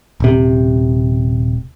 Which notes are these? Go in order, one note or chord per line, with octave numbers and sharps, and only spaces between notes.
D#1 C3